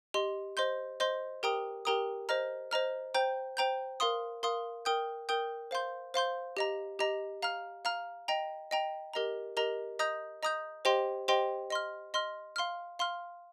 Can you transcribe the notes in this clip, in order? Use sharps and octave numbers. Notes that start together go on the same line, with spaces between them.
G4 D#5 C6
C5 D#5 C6 G6
C5 D#5 C6 G6
G4 A#4 G5 A#5 D#6
G4 A#4 G5 A#5 D#6
C5 D#5 A#5 F6
C5 D#5 A#5 F6
C5 G5 A#5 G6
C5 G5 A#5 G6
A#4 F5 C6 D#6
A#4 F5 C6 D#6
A#4 G5 D#6 G6
A#4 G5 D#6 G6
C5 F5 C6 G6
C5 F5 C6 G6
G4 D#5 A#5
G4 D#5 A#5
F5 A#5 F6
F5 A#5 F6
D#5 G5 A#5
D#5 G5 A#5
G4 A#4 D#5 A#5
G4 A#4 D#5 A#5
D#5 A#5 D#6 G6
D#5 A#5 D#6 G6
G4 C5 D#5 G5 C6
G4 C5 D#5 G5 C6
D#5 C6 F6
D#5 C6 F6
F5 C6 F6
F5 C6 F6